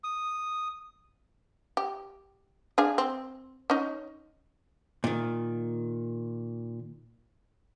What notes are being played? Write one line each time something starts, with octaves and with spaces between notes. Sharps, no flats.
D#6
G4
D4 G#4 F5
C4
C#4 D#4
A#2 D#3